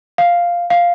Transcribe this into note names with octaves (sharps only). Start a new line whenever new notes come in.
F5
F5